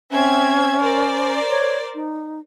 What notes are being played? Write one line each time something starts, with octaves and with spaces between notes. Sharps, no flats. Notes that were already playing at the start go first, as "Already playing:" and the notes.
C4 C#4 E5 G#6
A#4 C5 D5
C#5
D#4